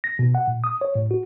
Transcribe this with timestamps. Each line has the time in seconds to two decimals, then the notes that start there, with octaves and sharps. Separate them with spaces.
0.04 A#6
0.19 B2
0.35 F#5
0.48 A#2
0.64 D#6
0.81 C#5
0.95 A2
1.11 F#4